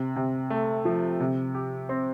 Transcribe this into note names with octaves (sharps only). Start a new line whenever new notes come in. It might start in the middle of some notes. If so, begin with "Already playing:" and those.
Already playing: C3
C3
A3
F3
C3
G4
C4